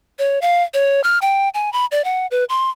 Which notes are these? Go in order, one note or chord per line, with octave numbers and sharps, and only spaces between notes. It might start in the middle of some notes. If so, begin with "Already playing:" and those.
C#5
F5
C#5
F6
G5
G#5
B5
D5
F#5
B4
C6